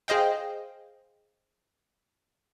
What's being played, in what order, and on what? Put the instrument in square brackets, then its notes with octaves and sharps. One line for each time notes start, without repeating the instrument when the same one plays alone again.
[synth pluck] G#4 C5 D#5 F5 G5